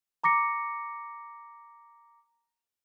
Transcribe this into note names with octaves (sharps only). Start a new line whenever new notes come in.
A#5 D6 A#6 C#7